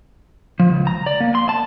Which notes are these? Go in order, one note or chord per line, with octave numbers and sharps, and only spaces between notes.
F3
C#2
A#5
D5
A#3
C6
A5